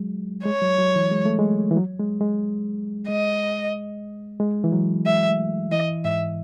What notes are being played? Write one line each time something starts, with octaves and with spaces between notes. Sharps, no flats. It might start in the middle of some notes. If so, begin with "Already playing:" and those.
Already playing: F#3 G#3
G#3 C#5
F#3
F#3
E3
G#3
A3
G#3
E3
F#3
G#3
G#3
G#3 D#5
G#3
E3
F#3
G#3 E5
A3
E3 D#5
G#2 E5